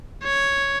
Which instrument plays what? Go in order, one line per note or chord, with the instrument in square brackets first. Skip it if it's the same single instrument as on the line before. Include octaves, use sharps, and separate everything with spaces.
[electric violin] C#5